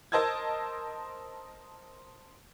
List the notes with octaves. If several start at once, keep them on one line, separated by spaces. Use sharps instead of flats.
A#4 C5 D#5 A5 E6 G#6